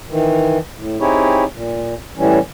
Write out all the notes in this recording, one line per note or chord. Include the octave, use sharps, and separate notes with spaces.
D#3 E3
A2
C4 D#4 E4 G4 G#4 C#5
A#2
A2 E3 G3 C#4